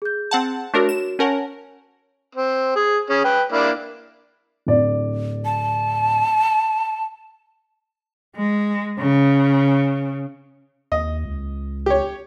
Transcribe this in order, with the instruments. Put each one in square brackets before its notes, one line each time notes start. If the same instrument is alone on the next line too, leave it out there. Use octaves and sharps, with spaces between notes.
[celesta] G#4 G6
[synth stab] C4 F#5 A5
[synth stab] A3 D4 A#4 [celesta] F#4 C#5
[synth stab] E7
[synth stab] C#4 A#4 F#5 [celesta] C#5 G#5 A5
[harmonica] C4
G#4
C#4 G#4
B4 G5
A#3 D4 E4
[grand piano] D1 D5
[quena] A5
[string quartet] G#3
C#3
[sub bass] D#2 [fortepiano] D#5
[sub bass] C#2
[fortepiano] G4 C#5